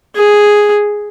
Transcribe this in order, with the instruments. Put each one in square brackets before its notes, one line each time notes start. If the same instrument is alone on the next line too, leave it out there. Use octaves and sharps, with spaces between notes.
[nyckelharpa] G#4